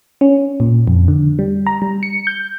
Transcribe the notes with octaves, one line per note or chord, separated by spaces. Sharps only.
C#4
A#2
F2
D3
G3
A#5
G3
C#7
G6